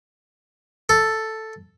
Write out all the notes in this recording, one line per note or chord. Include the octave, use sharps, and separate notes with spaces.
A4